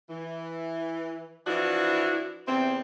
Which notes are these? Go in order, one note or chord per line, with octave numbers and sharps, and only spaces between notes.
E3
E3 F3 D4 E4 F#4
E2 C3 C4